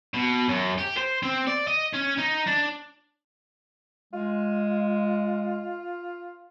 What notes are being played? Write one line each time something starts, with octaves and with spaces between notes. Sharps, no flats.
B2
F#2
G4
C5
C4
D5
D#5
C#4
D#4
D4
G#3 F4